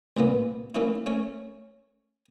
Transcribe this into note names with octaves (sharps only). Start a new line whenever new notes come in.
C2 A#2 A#3 B3
A3 A#3 C#4 D#4 E4
A3 C#4 C#5